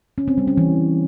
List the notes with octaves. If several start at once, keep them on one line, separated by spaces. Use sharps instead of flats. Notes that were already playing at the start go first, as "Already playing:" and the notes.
C#4
C4
G3
C#4
E3